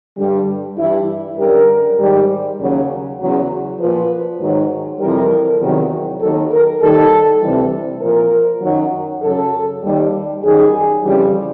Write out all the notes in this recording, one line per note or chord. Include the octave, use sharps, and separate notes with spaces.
G2 D3 G3
G2 E3 G3 E4
F#2 D3 G3 A#4
G#2 D#3 G3
D#2 C#3 F#3
E2 C#3 F#3
A#2 F3 B4
G#2 D#3 F#3
F2 C3 E3 G3 A#4
E2 C3 D#3 F#3
D#2 D#3 F#3 A4
A#4
D#2 D#3 G3 A4
D2 C3 E3 G3
A#2 F3 A#4
F#2 D#3 F#3
F#2 C#3 F#3 A4
D#2 D#3 G3
F#2 D#3 G3 G#4
F2 C#3 E3 G3